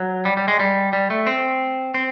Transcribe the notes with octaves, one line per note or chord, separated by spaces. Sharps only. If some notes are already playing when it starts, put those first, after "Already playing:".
Already playing: F#3
G3
G3
G#3
G3
G3
A3
C4
C4